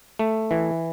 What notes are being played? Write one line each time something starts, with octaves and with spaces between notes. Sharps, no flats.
A3
E3